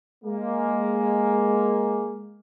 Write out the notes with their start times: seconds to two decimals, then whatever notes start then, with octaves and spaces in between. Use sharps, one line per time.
0.24 G#3 A#3